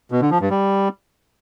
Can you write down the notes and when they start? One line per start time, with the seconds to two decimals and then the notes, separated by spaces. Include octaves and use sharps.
0.11 B2
0.21 D3
0.31 F3
0.41 G2
0.51 G3